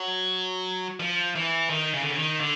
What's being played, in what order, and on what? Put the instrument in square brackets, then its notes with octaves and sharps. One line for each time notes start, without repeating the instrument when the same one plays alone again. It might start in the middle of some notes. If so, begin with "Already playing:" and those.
Already playing: [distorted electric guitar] F#3
F3
E3
D#3
C#3
D3
C#3
D#3
D3